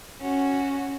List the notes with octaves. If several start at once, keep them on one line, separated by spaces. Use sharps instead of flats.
C#4 F#4